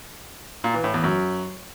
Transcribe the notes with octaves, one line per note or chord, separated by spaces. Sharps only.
A#2
E3
A2
E2
F#2